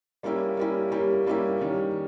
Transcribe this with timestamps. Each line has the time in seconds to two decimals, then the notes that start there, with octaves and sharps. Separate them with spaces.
0.23 G3 A#3 C#4 E4 G4
0.57 G3 A#3 C#4 E4 G4
0.91 G3 A#3 C#4 E4 G4
1.26 G3 A#3 C#4 E4 G4
1.60 D#3 G3 C#4